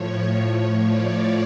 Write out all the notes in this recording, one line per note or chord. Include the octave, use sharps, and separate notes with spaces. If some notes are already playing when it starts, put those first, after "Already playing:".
Already playing: A2 F3 C#5
C#5
D5